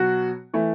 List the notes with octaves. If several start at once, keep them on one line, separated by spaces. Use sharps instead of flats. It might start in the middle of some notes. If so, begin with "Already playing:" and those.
Already playing: B2 F#3 F#4
E3 A3